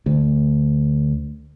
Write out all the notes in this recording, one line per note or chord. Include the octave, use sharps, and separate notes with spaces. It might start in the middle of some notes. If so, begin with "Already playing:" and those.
D2